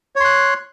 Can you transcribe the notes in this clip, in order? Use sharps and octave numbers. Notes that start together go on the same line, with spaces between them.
C#5 C6 F#6